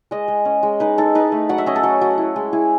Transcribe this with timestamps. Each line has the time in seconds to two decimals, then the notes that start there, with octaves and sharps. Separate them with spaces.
0.11 G#3 D#5
0.28 G#3
0.45 C#4
0.63 G#3
0.80 D#4 B4
0.98 D#4 A4
1.15 D#4 B4
1.32 A3
1.49 F#3 F#5
1.58 E5
1.66 C#4 D#5
1.76 A4
1.83 F#3
2.01 F#3
2.18 E4
2.36 G#3
2.53 E4 G#4